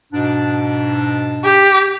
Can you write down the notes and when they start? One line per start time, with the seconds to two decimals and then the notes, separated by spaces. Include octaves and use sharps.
0.13 G#2 B2 D4
1.44 G4